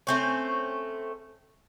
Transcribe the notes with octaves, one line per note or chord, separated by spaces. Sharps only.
A3 C4 C#4